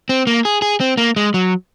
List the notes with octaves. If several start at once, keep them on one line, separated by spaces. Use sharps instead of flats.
C4
A#3
G#4
G#4
C4
A#3
G#3
F#3